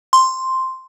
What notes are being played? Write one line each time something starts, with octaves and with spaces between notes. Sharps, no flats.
C6